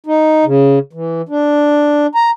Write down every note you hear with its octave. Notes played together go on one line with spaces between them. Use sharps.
D#4
C#3
E3
D4
A#5